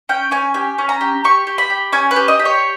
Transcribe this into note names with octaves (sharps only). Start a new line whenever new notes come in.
C#4 G5
C#4 G#5
G4 G#5
C#4
A#5
G4
G4 C#6
G4
B5
G4
C#4 G#5
B4
G4
D#5
G4
C#5